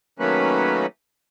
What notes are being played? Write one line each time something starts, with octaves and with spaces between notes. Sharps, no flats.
D#3 F#3 A3 A#3 C#4 B4